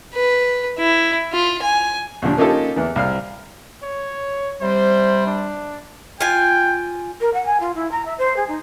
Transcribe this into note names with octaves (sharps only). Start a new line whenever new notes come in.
B4
E4
F4
G#5
D#2 A#2 F3 D4
A#3 C#4 D#4 F4 G4 A4
E2 E3
C2 F5 F6
C#5
C3 G3 C5
D4
F4 G5 G#5
A#4
F#5
G#5
F4
E4
A#5
E5
C5
G#4
D#4